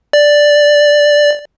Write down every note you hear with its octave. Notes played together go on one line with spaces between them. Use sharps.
D5